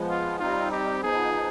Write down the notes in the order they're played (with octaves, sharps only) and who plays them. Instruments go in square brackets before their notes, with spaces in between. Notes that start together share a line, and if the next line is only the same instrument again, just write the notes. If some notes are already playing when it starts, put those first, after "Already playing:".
Already playing: [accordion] F3 G#3 B3
[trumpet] F4
[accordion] G3 C4 D#4 [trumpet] F4
[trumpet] G4
[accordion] F3 B3 D#4 [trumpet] G#4